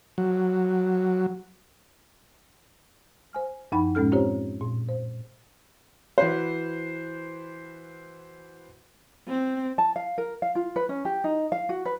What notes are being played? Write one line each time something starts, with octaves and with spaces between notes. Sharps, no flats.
F#3
C5 G#5 F6
F#2 F3 D#4 F#5 G5 B5
A2 G#3 C#4 A4 F6
C4 F4 G4 C5 C#5
A#2
C5
E3 F#4 B4 C5
C4
A5
F5
A#4
F5
F4
B4
C#4
G4
D#4
F5
F#4
B4